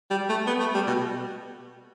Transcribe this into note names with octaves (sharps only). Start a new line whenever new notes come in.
G3
A3
B3
A3
G3
B2